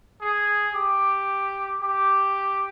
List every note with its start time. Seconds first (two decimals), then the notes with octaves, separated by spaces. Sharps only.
0.21 G#4
0.75 G4
1.82 G4